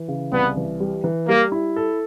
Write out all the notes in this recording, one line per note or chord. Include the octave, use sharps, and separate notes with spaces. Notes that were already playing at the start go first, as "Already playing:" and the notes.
Already playing: E3
C#3
C2 B3
E3
G3
E3
G3 A#3
E4
A4